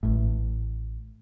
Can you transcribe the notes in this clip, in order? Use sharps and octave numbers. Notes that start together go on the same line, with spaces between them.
A1 A2